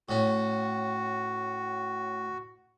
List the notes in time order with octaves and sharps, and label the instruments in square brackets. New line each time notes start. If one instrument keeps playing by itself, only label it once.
[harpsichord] A2 C#4 [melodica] F#4